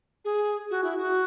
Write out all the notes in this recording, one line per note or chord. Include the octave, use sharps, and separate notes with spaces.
G#4
F#4
E4
F#4